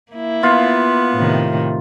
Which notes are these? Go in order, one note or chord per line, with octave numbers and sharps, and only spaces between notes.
A#3 E4
B3 F4
A2 C3 D#3